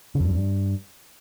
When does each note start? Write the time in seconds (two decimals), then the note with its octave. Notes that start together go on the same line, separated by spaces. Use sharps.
0.15 C#3
0.20 F2
0.25 G2
0.30 F2
0.35 G2